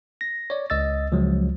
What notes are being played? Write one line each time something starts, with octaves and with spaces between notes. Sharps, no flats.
A#6
C#5 D5
C#2 D#5 E6 A6
C#2 F3 F#3